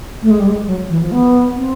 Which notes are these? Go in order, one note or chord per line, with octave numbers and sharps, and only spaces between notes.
A3
G#3
G3
G#3
F#3
E3
F3
B3
C4